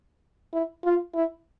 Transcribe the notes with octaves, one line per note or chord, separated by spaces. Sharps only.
E4
F4
E4